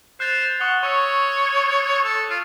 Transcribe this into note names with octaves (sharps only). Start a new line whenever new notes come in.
C5 F#6 A6 F7
F#5 C#6 D#6 G7
C#5 C#6 E6 C#7
A4
F4